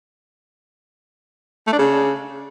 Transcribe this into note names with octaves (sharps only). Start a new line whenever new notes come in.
A3
D4
C#3